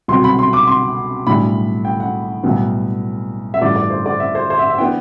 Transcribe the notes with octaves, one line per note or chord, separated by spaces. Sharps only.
C2 B2 F#3 C4 C6
B5
C6
D6
C6
B1 A2 G3 D4 B5
G5
F#5
B1 A2 G3 B3
E5
A1 G2 E3 D5
D5
C5
D5
E5
C5
C5
E5
E5
E3 B3 D4 G5